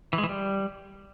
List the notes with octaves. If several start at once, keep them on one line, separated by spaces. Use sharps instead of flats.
E3
G#3
E3
G3